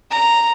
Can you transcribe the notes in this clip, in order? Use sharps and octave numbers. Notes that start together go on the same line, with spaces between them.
A#5